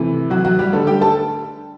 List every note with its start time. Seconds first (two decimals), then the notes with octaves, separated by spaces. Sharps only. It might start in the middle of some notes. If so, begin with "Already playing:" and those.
Already playing: C3 E3 A3 E4
0.30 F#3 F#4
0.45 F#3 F#4
0.59 G3 G4
0.73 D3 G3 A3 A4
0.87 G4 G5
1.01 A4 A5